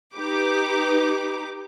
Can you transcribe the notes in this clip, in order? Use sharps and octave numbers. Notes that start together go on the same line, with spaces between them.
D#4 G4 B4 D6